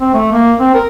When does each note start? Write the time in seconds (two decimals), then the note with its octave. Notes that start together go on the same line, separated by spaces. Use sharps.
0.01 C4
0.13 A3
0.32 A#3
0.60 C4
0.74 A#4